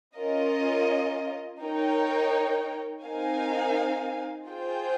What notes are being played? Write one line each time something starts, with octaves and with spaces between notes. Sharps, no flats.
C#4 F4 A#4 D#5
D#4 A#4 C#5 G5
C4 D#4 A#4 F5 G#5
F4 G#4 C5 G5